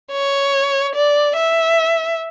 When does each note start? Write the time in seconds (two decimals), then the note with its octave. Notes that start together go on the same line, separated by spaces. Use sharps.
0.12 C#5
0.95 D5
1.36 E5